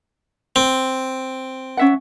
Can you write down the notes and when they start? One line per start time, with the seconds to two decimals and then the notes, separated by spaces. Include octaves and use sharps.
0.56 C4
1.77 C#4 E5 F#5